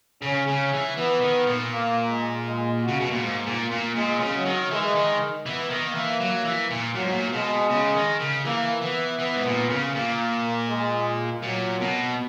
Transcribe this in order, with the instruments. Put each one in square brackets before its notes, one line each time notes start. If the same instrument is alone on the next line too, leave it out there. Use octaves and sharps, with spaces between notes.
[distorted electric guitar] C#3 [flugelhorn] C#4
[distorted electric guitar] C#3
E3
[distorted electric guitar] E3 [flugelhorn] B3
[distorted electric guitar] D#3
A#2
[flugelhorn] A#3
G#3
G#3
[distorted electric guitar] C#3 [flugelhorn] F#4
[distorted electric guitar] B2
A#2
[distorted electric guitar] G#2 [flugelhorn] A#3
[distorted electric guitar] A#2
A#2
[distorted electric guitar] A#2 [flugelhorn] G#3
[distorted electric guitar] C#3
[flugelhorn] F#3
[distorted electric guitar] D#3
[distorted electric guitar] E3 [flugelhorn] G#3
[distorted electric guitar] D#3
[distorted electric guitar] E3 [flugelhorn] B3
[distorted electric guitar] D#3
[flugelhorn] A#3
[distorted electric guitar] E3
F#3
E3
A#2
[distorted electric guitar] A#2 [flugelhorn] F#3
[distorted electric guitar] G#2
A#2
[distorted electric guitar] B2 [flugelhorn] G#3
[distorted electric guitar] C#3
D#3
C#3
[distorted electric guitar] E3 [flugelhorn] A#3
[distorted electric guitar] E3 [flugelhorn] B3
[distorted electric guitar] E3 [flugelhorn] B3
[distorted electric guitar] G#2
A#2
C#3
[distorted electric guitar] A#2 [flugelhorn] A#3
[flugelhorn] G#3
[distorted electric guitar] A#2 [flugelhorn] F#3
[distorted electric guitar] B2